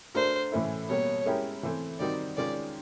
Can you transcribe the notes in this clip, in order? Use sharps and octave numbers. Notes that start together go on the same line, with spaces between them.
A3 D4 F#4 A#4 C5
A2 E3 A3 C#4 E4
B2 G3 A#3 C#5
G#3 C#4 E4 G4 A#4
E3 A3 C4
D#3 G3 C4 D#4 F#4 D5
D#3 G#3 C#4 F4 D5